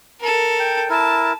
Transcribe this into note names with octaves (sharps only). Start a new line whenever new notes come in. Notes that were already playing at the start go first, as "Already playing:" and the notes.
A4 A#4
G5
E4 A#4 A5